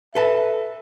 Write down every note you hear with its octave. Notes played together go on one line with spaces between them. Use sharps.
A4 B4 E5 A5